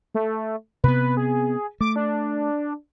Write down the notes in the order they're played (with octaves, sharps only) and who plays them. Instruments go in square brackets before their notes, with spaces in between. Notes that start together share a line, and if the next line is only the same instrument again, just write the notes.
[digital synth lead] A3
[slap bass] C3 B3 [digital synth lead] B4
[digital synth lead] G#4
[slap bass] A3 [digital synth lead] D6
[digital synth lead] D4